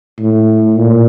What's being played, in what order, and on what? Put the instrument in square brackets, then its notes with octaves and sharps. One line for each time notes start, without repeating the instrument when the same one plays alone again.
[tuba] A2
A#2